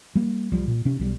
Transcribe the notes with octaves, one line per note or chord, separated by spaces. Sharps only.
G3 A#3
C2 F3 G3
A#2
C3 C#4
B1 E3 G3